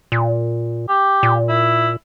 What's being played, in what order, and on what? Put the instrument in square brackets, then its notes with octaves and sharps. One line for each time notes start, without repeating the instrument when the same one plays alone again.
[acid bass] A#2
[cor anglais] G4
[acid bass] A#2
[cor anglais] E4